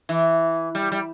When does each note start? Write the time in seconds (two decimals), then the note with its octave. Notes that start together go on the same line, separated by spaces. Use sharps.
0.09 E3
0.75 G3
0.92 G3